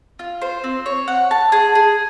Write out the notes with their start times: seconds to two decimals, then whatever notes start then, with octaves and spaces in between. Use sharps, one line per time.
0.19 F4
0.41 C5
0.64 C4
0.86 C#5
1.08 F#5
1.31 A5
1.52 G#4
1.75 G#4